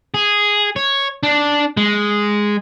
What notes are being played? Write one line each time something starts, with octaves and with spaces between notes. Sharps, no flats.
G#4
C#5
D4
G#3